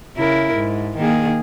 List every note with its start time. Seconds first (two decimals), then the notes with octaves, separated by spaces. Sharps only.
0.17 C#3 E4 A#4
0.55 G#2
0.97 D#3 A#3 G#4